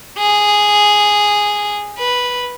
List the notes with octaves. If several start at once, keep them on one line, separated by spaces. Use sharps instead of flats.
G#4
B4